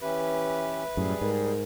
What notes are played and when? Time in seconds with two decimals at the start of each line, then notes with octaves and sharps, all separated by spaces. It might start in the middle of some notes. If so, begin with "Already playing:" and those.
0.01 E3 C#4 G4 B4 E5
0.97 F#2 A2 G3 G#4
1.21 G#2 A#4